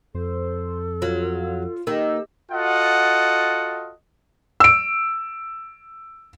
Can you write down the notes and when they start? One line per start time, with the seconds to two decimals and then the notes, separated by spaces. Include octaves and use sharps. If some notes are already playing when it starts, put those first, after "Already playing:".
0.15 F2 A4 C5
1.02 F#3 F4
1.87 D#3 A#3 G4 E6
2.51 F4 F#4 A4 D#5 F#5
4.60 E6 D7